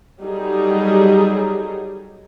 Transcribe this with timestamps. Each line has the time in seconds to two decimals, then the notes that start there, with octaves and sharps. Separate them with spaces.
0.22 F#3 G3 D#4 G#4 A4